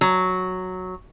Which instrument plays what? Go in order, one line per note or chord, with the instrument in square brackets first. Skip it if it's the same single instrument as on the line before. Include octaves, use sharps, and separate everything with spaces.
[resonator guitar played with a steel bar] F#3